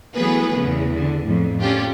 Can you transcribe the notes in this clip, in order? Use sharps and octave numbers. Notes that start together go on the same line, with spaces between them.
E3 F#3 A3 B3 G#4 B4
E2 C#3
D3
F2 A2
A3 C#4 D4 F4 G4